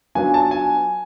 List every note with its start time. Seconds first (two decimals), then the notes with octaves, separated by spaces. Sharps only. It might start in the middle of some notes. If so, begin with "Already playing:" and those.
0.15 F#3 B3 D4 F4 G#5
0.34 A5
0.51 G#5